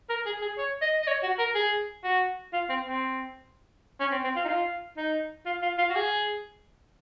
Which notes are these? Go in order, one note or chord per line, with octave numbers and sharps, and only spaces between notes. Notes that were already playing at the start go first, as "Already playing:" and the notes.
A#4
G#4
G#4
C#5
D#5
D#5
C#5
F#4
A#4
G#4
F#4
F4
C4
C4
C#4
C4
C4
F4
D#4
F4
D#4
F4
F4
F4
F#4
G#4